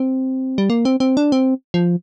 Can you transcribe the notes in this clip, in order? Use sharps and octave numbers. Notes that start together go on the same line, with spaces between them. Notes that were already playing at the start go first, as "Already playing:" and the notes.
Already playing: C4
G3
A#3
C4
C4
D4
C4
F3